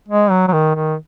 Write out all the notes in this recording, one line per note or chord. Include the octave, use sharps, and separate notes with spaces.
G#3
F#3
F#3
D#3
D#3